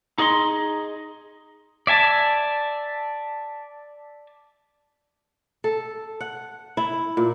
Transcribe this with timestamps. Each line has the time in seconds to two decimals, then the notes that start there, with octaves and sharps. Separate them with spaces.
0.18 D#4 G#4 D#5 B5 C6
1.87 D5 E5 G#5 A5
5.64 A4
6.21 F#5
6.77 E4
7.17 A#2